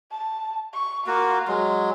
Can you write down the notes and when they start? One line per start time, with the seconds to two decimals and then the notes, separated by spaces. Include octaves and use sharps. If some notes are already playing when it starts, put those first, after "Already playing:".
0.11 A5
0.73 C#6
1.07 A#3 F4 F#4
1.48 F#3 G#3